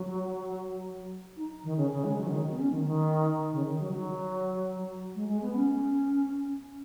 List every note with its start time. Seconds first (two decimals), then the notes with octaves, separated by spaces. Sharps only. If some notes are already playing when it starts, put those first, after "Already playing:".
Already playing: F#3
1.37 D#4
1.64 D#3
1.77 C#3
1.91 C#3
2.04 G#3
2.18 F#3
2.27 C#3
2.31 D#3
2.52 B3
2.59 C#4
2.72 D#3
2.86 D#3
3.52 C#3
3.66 D#3
3.80 F#3
3.93 F#3
5.15 G#3
5.28 G#3
5.42 B3
5.55 C#4